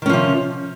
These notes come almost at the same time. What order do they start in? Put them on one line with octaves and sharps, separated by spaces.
D#3 C#4 F3 C3